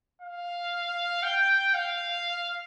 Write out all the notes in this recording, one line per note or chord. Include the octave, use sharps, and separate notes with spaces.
F5
G5
F5